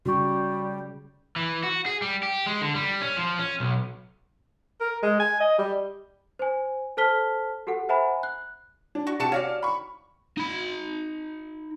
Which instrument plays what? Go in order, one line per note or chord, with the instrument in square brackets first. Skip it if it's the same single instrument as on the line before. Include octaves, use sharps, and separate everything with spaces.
[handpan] C#3 [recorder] G3 [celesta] F#4 C#6
[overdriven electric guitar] E3
F#4
G#4
G3
G4
G#3
D3
G3
C#4
F3
C#4
B1
[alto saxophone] A#4
G#3
G#5
D#5
G3
[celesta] C5 G#5
A4 C5 A5 F6 B6 G7
F#4 G4 A4 F#5
C5 E5 F#5 G#5 A#5 B5
F#6
[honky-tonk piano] D4
[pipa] F#4 C#6
[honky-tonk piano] C3 C#7 E7 [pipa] D4 F#4 A5
[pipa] C#4 F#4 D5 [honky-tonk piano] F5
[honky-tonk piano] B5 C#6
[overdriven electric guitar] D#4 B5